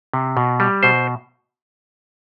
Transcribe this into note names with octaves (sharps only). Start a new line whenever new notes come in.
C3
B2
G3
B2 C5